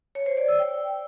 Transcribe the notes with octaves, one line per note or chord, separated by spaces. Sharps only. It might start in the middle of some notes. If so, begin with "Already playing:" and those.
C#5
C5
D5
E6
G5